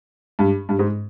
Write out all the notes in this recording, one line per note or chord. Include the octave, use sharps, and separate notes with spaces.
G2
G2
G#2